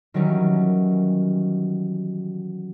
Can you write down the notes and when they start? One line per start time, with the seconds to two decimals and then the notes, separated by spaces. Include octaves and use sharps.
0.14 D#3 E3 F#3 G3 C#4